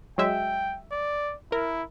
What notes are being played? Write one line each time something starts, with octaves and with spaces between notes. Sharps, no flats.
F#3 G#3 E5 G5
D5
E4 A#4